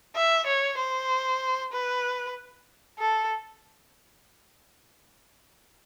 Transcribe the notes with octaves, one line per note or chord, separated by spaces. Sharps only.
E5
C#5
C5
B4
A4